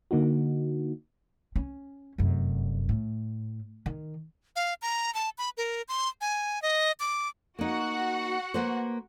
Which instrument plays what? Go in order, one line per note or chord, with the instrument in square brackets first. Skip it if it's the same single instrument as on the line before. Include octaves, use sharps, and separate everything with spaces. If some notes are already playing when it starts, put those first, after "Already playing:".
[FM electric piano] D3 A#3 D#4 F#4
[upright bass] C#4
F1 F#2
A2
D#3
[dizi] F5
A#5
A5
B5
A#4
C6
G#5
D#5
D6
[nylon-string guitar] A#3 D#4 [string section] F#4 F#5
[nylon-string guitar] A#3 B4 C5